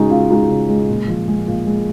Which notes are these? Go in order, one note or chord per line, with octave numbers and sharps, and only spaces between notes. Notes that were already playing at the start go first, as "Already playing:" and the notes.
Already playing: C#3 G#3 D#4 F#4
C#3 F4
G#3 D#4 F#4
C#3
G#3
A#2
F3
G#3
A#2 F4
G#3